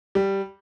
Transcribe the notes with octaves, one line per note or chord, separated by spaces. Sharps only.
G3